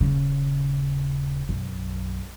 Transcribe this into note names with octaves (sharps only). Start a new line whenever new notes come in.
D#1 C#3
B1 F#2